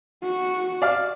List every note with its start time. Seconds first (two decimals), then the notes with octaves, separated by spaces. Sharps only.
0.23 F#4
0.82 D5 F5 F6